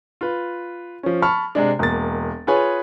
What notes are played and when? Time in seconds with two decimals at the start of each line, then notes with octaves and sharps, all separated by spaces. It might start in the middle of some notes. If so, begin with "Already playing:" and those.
0.21 F4 B4
1.03 F3 C#4
1.22 A5 B5 C#6 F6
1.55 C3 G#3 D4
1.79 E1 A#3 A6
2.47 F4 G#4 B4 C#5 G#5